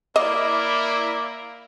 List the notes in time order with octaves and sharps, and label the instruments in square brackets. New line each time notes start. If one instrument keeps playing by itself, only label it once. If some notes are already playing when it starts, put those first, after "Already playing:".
[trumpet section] A#3 E4 [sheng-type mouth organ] D5 [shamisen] D#5 [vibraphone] D6